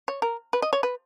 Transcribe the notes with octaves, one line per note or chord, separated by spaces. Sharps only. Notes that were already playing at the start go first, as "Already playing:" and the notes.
C#5
A#4
B4
D#5
C#5
B4